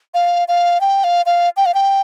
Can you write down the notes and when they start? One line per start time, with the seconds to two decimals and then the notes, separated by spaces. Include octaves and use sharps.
0.14 F5
0.48 F5
0.81 G5
1.04 F5
1.26 F5
1.57 G5
1.66 F5
1.74 G5